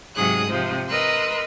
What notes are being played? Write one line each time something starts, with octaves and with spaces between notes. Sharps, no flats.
G#2 C3 F#3 G#4 D#6 F#6
C3 F3 C5
A#4 B4 D#5 C6 E6 F#6